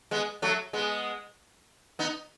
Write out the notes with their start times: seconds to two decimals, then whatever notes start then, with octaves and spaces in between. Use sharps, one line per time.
0.11 G#3 B3
0.42 F#3 A3
0.73 G#3 B3
1.99 B3 D#4